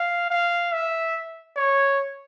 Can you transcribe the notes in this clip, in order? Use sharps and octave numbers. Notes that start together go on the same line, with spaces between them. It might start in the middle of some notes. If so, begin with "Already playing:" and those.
Already playing: F5
F5
E5
C#5